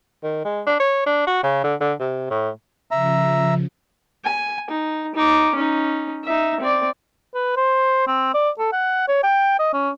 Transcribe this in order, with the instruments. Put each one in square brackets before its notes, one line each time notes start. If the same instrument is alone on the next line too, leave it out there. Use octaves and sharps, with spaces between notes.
[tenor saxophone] D#3
G#3
D4
C#5
D4
F#4
C#3
D3
D3
C3
A2
[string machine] C#3 F3 [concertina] E5 A#5
[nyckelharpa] G#5
D#4
D#4 D6
C#4 D#4
D#4 E5
C4 D5
[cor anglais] B4
C5
C4
D5
A4
F#5
C#5
G5
D#5
C#4